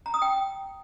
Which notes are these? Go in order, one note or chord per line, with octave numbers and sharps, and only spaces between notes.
A#5
D#6
G5